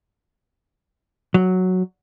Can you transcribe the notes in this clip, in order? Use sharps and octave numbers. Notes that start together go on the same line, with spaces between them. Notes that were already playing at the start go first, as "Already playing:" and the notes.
F#3